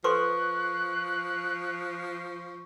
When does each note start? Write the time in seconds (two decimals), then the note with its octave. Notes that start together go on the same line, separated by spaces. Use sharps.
0.04 F3 A4 B4 C6 C#6 F#6